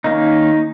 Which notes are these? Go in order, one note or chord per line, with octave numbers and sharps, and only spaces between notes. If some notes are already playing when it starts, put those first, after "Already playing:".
D#3 A#3 C#4 D#4